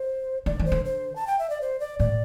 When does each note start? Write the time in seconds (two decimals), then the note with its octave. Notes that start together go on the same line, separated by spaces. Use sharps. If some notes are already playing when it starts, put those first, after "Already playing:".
Already playing: C5
0.46 D3 D5
0.59 E3
0.65 C5
0.72 D3
0.85 C5
1.16 A5
1.27 G5
1.39 E5
1.50 D5
1.61 C5
1.80 D5
1.99 A2 D5